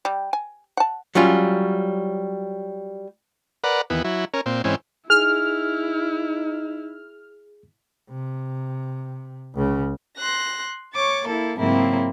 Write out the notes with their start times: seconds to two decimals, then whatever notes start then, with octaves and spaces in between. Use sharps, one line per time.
0.05 G3
0.33 G#5
0.77 F#5 A5
1.15 F#3 G3 C#4 F4
3.64 A#4 B4 D5 F#5
3.90 D#2 E3 B3
4.04 F#3 E4
4.34 C#4 A#4
4.46 A#2 C4
4.64 G#2 E3 C4 C#4
5.10 D#4 E4 G#4 F6
8.10 C3
9.55 C#2 C#3
10.16 C6 F#6 A#6
10.93 C#5 C#6 D6 A6
11.25 A#3 E4 A4
11.56 G#2 C#3 F#3 A#3 C4 E4